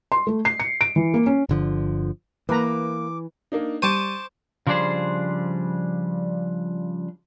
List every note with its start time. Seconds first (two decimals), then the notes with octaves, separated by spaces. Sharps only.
0.12 C6
0.27 A3
0.45 C7
0.60 C#7
0.81 D7
0.96 E3
1.14 A#3
1.26 C#4
1.49 G1 D3 F3
2.49 E3 A#3 B4 A#5 D6
3.52 A#3 D4 D#4
3.82 G3 C5 A5 C#6 D6 D#7
4.67 C#3 F3 G3 D4 G#4 C5